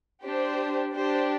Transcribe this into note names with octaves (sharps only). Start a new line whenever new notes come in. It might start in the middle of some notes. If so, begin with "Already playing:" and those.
D4 G4 C5
D4 G4 C5